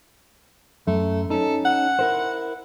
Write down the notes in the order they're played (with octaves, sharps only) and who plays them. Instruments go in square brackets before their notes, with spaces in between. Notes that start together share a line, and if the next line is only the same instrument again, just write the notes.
[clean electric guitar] F#2 [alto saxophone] A3
[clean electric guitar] C#4 D#4 [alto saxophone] A4
[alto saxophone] F#5
[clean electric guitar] E4 A#4 C5